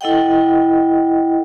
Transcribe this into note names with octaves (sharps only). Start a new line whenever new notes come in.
E4 A4 D#5 F#5 G5